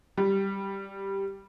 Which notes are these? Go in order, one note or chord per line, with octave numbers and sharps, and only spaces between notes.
G3